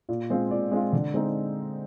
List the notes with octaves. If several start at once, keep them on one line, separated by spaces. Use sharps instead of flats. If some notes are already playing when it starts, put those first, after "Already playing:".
A#2
G#3 C4 F4
A#2 D5
G#3 C4 F4
D3
G#3 C4 D#4